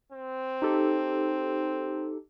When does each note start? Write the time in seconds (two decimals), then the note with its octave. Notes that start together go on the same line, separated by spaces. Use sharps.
0.12 C4
0.62 D#4 G4 A4